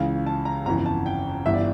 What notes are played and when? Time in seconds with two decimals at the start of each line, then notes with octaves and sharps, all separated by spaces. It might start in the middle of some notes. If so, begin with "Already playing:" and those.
Already playing: C#2 C#3 E3 F5
0.26 A5
0.45 A#5
0.65 G1 F2 C#3 E3 A#5
0.86 A5
1.06 G5
1.46 G1 G2 E3 E5
1.54 D5